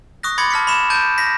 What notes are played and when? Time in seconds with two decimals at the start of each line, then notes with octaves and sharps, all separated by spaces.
0.23 C#6 D#6 F#6 A#6
0.38 B5 C6 D6 G#6 A6 C#7
0.50 A5 F6 B6 C#7
0.67 B5 C#6 E7
0.90 A5 G6 A6 D7
1.18 B5 A#6 B6